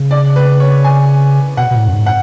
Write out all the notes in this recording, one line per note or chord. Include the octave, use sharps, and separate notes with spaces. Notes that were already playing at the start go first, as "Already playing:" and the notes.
Already playing: C#3
D5
B4
C#5
G#5
B2 F#5
B2
A2
F#2
G#2
F#5